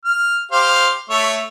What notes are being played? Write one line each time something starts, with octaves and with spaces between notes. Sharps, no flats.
F6
G4 C5 F5
A3 C#5 E5